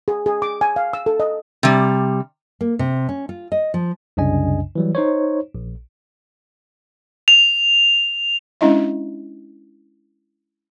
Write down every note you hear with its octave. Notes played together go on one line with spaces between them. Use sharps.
G#4
G#4
D6
G#5
F5
E6
A4
D#5
C3 G3
A#3
C3
C#4
F4
D#5
F3
C2 F#2 C#3 D4 D#5 G#5
E3 F#3 G3
D#4 C5 C#5
A#1
F7
G#3 C#4 D4 E4 D#5 E5